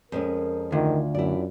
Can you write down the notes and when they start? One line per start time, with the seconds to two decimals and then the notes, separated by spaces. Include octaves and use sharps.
0.12 F2 G#3 C#4 A#4
0.72 D2 D#3 D4 F4
1.15 F#2 E4 D5